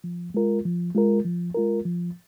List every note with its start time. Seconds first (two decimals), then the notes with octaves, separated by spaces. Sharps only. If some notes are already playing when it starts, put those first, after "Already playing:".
0.04 F3
0.34 G#3 F4 A#4
0.65 F3
0.95 G#3 F4 A#4
1.25 F3
1.55 G#3 F4 A#4
1.85 F3